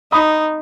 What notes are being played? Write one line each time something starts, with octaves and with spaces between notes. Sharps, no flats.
D#4 B5 D#6